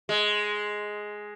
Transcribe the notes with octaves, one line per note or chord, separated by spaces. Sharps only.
G#3